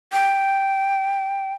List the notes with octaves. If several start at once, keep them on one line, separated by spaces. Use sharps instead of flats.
G5